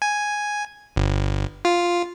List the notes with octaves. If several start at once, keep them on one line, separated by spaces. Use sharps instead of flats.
G#5
G1
F4